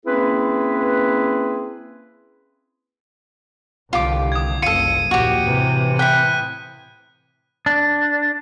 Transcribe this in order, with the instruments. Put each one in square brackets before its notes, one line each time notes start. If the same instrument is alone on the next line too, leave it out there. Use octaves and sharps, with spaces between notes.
[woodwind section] A#3 C4 C#4 E4 G#4 B4
[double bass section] C2 D3 D#3 [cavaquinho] F4 G4 D6
[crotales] D#6 G#6
[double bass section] F#1 C2 [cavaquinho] F4 A4 [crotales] C#7 D#7
[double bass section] A#1 D#2 [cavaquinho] F#4 G4
[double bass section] A2 C3 E3
[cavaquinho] E4 G5 [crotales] F#6 B6
[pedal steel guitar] D4